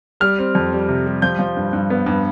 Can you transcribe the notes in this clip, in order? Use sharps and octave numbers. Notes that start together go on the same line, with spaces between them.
G3 F6
C4
F2
G3
C3
G3
F3 G6
F3
G2
G2
B3
G2